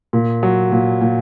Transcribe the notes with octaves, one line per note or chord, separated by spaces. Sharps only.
A#2
F#3
A#2
A#2